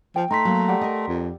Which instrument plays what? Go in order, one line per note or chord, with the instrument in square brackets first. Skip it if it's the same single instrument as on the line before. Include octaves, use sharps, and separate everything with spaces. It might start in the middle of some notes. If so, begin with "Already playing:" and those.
[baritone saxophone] F3 [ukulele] G5
[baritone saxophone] A3 [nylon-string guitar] D#4 [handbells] A#5 C6 B6
[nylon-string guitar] F#3 A#3
[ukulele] G4 D5 F#5
[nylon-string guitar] A#4 D#5
[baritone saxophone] F2